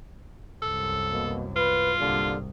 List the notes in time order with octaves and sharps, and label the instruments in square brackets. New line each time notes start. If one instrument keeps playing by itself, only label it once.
[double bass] C2 F#2 [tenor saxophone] A4
[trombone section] B2 A#3
[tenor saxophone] F4 [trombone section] B4
[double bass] C2 G#2 [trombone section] D3 G3 A#3